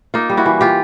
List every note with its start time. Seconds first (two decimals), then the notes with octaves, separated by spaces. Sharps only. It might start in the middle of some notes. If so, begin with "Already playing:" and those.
0.14 A#3 D#4 F4
0.29 G3
0.37 E4 F#4
0.46 E3
0.61 F4 G4